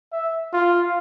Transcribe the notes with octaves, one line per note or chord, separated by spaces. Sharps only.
E5
F4